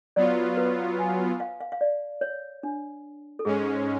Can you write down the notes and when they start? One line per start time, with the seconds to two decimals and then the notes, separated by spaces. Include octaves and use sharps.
0.16 F#3 B3 F4 D5
0.57 B4
0.99 G#5
1.40 F5
1.60 F5
1.72 F5
1.81 D5
2.21 C#5
2.63 D4
3.39 A4
3.45 G#2 G#3 C#4 G#4